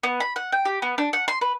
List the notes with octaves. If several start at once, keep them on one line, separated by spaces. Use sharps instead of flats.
B3
B5
F#5
G5
G4
B3
D4
F#5
C6
B4